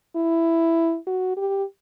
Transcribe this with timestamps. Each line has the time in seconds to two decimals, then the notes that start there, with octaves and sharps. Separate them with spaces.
0.16 E4
1.07 F#4
1.37 G4